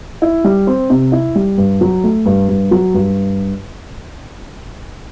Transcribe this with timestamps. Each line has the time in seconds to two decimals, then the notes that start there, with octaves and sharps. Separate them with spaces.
0.22 E4
0.44 G3
0.67 C4
0.90 C3
1.12 E4
1.35 G3
1.58 G2
1.81 F#3
2.04 A3
2.26 G2
2.49 G2
2.71 F#3
2.94 G2